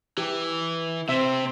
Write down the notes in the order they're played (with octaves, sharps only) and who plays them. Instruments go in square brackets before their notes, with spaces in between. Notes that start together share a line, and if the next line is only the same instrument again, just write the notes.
[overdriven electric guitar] E3 [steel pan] G4
[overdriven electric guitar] C3 [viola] C4 [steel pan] E5